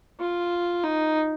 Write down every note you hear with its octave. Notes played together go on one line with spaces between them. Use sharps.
F4
D#4